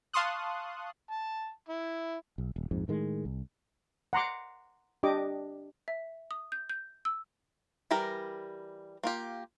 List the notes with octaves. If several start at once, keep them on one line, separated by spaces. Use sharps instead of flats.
F5 A5 C6 C#6 D#6 F#6
A5
E4
B1
D#1
A#1 F2 G#2
A2 D#3 G#3
C2
F#5 A#5 C6 D6
D4 G4 D#5 D6
E5
D#6
G6
G6
E6
E3 G3 G4 A#4 A#5
A#3 F4 G4